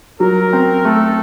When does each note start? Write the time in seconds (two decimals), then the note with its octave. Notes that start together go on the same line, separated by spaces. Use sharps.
0.20 F#3 A#4
0.53 C4
0.85 A3 A4